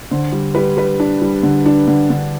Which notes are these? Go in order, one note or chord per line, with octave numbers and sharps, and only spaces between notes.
D3 C5
G3
G3 B4
G3 B4
D4
G3
D3
D4
D3
D3